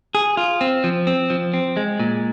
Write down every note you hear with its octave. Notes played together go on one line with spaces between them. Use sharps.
G#4
F4
C4
F3
C4
F3
C4
G#3
A#2